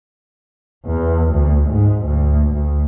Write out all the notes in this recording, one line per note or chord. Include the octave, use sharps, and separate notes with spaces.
E2
D2
G#2
D2
D2